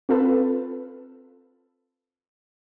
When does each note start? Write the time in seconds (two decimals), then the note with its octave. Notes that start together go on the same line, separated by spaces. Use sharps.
0.09 C4 F4 A4 B4